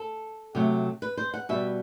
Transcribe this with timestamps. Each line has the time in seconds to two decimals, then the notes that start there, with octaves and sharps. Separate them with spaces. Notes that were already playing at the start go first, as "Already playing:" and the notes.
Already playing: A4
0.55 C3 F#3 A3
1.02 B4
1.17 C5
1.34 F#5
1.49 B2 G3 E5